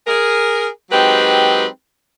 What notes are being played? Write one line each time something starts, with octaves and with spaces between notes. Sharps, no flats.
G#4 A#4
F#3 G#3 C4 D#4 G4 B4